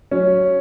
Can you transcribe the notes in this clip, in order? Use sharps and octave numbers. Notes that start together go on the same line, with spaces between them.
F#3 C#4